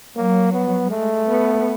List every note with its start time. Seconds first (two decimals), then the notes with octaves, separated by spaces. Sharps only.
0.16 F#3 A#3
0.53 B3
0.90 G#3 A3
1.28 B3